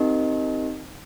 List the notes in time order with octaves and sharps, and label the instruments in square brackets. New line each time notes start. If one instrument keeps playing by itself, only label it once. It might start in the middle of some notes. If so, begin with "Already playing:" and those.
Already playing: [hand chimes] C4 D#4 G4 A#4 D#5